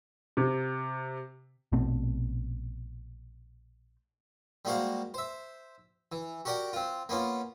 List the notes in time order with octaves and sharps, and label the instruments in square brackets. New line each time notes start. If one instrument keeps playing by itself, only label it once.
[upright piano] C3
[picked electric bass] A#1 B2 A3 C4
[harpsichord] G3 G#3 A#3 F#4 C5 F5
C5 E5
E3
F#4 G4 A#4 D5 F#5 G5
C4 F4
A#3 B3 C#4 F4